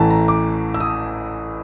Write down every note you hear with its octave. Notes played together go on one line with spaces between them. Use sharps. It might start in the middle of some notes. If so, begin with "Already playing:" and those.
Already playing: A1 A2 E3 A5 A#5
A#5
D6
E6
D#6